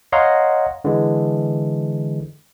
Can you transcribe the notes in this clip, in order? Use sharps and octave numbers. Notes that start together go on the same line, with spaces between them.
C#5 D#5 F5 F#5 A#5 C6
D3 E3 G#3